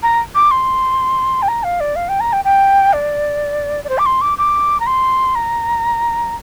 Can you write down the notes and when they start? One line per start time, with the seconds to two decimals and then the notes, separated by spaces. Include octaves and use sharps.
0.03 A#5
0.35 D6
0.51 C6
1.42 G5
1.48 A#5
1.64 F5
1.80 D5
1.96 F5
2.09 G5
2.20 A#5
2.33 G5
2.44 G5
2.93 D5
3.84 D5
3.89 C5
3.98 D6
4.06 C6
4.21 D6
4.38 D6
4.80 A#5
4.86 C6
5.35 A#5